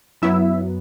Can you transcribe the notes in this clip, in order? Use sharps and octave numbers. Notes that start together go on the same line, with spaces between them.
F#2 F#3 B3 E4 E5